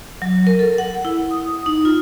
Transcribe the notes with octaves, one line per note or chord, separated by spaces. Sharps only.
F#3
A#4
A4
F#5
E4
D#6
D#4
F4